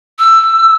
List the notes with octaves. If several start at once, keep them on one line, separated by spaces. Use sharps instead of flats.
E6